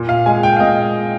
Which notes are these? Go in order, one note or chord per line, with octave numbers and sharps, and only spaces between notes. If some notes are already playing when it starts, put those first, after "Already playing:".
Already playing: A#2
F5
G#3 G#5
G5
F5
A#2 D#5